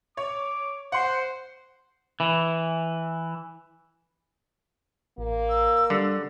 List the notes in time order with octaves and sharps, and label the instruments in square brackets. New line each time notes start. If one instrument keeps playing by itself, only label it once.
[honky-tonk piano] C#5 [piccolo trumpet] D6
[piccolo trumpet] C5 [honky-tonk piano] F#5 C6
[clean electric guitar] E3
[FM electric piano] A1 [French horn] A#3
[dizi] E6
[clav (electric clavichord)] D3 [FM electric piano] G3 D4